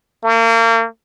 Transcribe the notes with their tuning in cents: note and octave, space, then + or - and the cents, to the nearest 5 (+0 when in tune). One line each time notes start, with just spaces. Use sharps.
A#3 -35